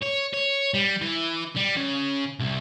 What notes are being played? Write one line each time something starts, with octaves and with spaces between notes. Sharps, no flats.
C#5
C#5
G3
E3
G3
C#3
C2